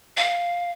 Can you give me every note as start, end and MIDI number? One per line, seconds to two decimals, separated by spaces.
0.17 0.71 77